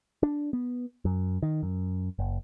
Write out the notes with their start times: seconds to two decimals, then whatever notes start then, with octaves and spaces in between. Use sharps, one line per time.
0.23 D4
0.53 B3
1.05 F#2
1.42 D#3
1.63 F#2
2.19 F#1